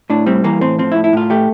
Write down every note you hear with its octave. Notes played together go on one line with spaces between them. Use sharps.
A2 D4
G3 C4
E3 A#3
A2 C4
F3 C4
E4
A2
E4
A2 F4
A3 G4